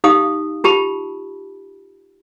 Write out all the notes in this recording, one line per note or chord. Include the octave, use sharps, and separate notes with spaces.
D#4 G4 F5 D#6
F4 G4 A5 B5